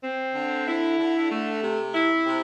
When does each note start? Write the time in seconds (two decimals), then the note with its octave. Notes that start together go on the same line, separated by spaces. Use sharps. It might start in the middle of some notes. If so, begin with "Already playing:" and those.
0.03 C4
0.35 D3
0.68 E4
0.99 D3
1.31 A3
1.63 C3
1.95 E4
2.26 C3